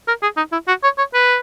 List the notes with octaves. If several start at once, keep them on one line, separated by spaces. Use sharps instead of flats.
A#4
G#4
D#4
E4
F#4
C#5
C#5
B4